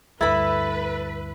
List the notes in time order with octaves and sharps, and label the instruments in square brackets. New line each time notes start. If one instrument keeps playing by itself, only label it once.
[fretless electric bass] D2 G2 [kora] E4 [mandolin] A4 B5 [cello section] B4